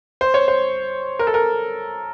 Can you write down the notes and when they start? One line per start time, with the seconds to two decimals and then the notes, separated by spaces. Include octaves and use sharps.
0.21 C5
0.34 C#5
0.48 C5
1.19 A#4
1.27 A4
1.34 A#4